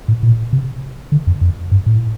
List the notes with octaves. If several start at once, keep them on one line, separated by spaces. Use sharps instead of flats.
A2
A#2
C3
D3
F2
F2
G2
A2